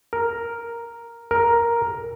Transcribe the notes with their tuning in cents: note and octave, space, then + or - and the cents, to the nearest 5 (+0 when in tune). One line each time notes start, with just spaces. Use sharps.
A#4 +0
A#4 +5